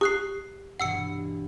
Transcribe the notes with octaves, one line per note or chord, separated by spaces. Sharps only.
G4 D#6 F#6 C7
G2 B2 E3 F#5 E6 C#7